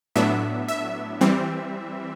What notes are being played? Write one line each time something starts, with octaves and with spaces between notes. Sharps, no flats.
A2 F#3 B3 D4 E5
E5
E3 G3 C4